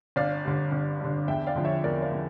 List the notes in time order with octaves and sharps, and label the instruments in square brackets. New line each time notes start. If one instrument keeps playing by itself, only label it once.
[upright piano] G1 D5 F5
G2 D3
G1
G2 D3
E2 E5 G5
D5 F5
D3 F3
C#5 E5
E2 A#4 D5
D5 F5
D3 F3